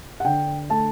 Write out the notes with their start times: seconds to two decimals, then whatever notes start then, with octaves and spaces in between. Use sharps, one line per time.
0.20 F#5
0.25 D3 G5
0.70 A3 A5